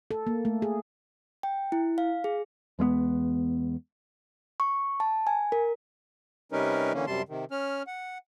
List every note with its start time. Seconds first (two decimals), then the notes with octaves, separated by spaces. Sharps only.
0.11 A4
0.27 A#3
0.45 A3
0.62 G#4
1.43 G5
1.72 E4
1.98 F5
2.24 G#4
2.79 E2 G#3 A3 B3
4.60 C#6
5.00 A5
5.27 G#5
5.52 A#4
6.52 C3 G3 C#4 D#4 A#4 B4
6.93 D3 E3 A#3 C#4
7.07 F#2 C3 G3 A5 C6
7.29 C3 D#3
7.51 C#4 F6
7.87 F#5